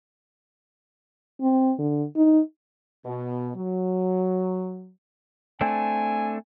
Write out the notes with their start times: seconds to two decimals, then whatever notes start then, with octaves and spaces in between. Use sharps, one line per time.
1.41 C4
1.78 D3
2.16 D#4
3.05 B2
3.56 F#3
5.61 A3 C4 D4 G#5